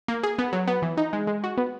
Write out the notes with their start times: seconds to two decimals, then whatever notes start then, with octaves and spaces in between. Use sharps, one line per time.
0.08 A#3
0.23 G#4
0.39 B3
0.53 F#3
0.68 B3
0.82 E3
0.97 D#4
1.13 G#3
1.27 G#3
1.44 F#4
1.57 B3